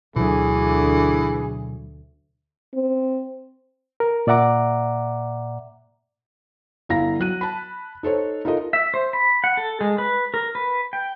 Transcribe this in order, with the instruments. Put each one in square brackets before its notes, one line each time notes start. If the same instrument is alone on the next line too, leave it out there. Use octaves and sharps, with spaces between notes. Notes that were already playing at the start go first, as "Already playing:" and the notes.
[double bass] D2 D3 [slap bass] B2 F#3 [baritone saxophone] E3 [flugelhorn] G#4
[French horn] C4
[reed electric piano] A#4
A#2 D5 E5 F#5 A#5 D6
[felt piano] G1 E4 F5 A#5 A#6
F#3 F#6 D#7
A5 B5
D#4 A4 C5 C#5
D#4 F4 A4 A#4 D#5
[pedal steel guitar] E5
C5
B5
F#5
A4
G#3
B4
A#4
B4
G5